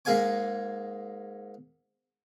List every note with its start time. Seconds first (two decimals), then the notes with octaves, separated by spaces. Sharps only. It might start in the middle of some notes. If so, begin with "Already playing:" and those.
0.05 G#2 A#3 G#4 F5 G#5 D6